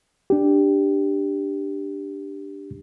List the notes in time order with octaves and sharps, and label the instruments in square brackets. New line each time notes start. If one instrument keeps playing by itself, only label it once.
[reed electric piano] D4 G4